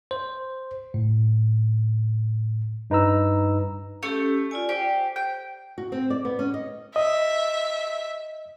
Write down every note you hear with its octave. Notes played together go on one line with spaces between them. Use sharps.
C5
A2
G2 D#4 B4 A#5 E6
A3 C#4 G4
F4 D5 G#5
G4 C5
G5
F#4
C4
D5
B3
C#4
D#5
D#5 E5